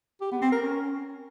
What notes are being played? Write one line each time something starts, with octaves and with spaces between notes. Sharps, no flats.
G4
B3
C4
A#4
C#4